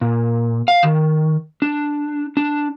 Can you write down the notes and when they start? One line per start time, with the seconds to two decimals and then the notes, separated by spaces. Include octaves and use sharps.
0.01 A#2
0.68 F5
0.83 D#3
1.62 D4
2.37 D4